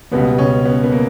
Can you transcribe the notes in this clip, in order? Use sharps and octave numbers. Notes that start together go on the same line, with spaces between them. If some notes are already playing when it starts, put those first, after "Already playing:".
C#2 B2 G3 B3
C#3 C#4
B3
B3
A#3